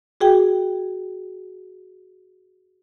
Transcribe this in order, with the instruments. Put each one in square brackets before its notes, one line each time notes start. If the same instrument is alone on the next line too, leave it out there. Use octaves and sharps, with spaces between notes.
[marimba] F#4 G#4 G5